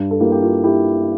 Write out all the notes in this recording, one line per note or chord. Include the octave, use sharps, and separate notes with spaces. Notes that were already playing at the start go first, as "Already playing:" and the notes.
Already playing: G2
A4
A#3 E4 G4
G4
F4
E4 G4